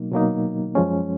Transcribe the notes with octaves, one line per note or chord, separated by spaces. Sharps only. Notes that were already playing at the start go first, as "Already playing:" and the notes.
Already playing: B2 F#3 A#3 D#4
B2 F#3 A#3 D#4
F#2 F3 G#3 C#4